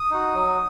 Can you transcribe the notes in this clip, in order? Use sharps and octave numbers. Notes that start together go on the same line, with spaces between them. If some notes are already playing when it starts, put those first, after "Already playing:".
Already playing: D#6
D#4 F#4
F#3